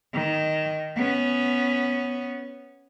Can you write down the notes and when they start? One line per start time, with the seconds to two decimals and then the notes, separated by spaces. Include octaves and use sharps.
0.14 D#3
0.96 B3 C#4